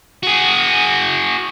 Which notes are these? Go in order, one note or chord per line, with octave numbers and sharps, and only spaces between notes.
F#4 G#4